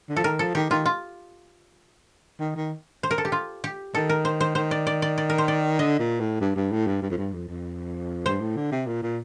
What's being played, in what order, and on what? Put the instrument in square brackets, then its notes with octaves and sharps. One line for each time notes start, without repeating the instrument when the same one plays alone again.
[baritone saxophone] D3
[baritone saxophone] F3 [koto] A4
[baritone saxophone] D#3 [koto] A#4
[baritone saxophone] F3 [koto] A4
[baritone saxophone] D#3 [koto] G4
[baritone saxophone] D#3 [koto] F4
[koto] F4
[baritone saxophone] D#3
D#3
[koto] C5
A#4
A4
G4
F4
G4
[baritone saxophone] D#3 [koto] A4
[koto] A#4
C5
C5
[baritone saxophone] D#3 [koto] C5
[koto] D5
D5
D5
D5
A#4
C5
D5
[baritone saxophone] D3 [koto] D#5
[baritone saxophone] A#2
A2
G2
G2
A2
G2
G2
F2
G2
F2
F2
[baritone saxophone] G2 [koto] C5
[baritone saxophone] A2
D3
C3
A#2
A#2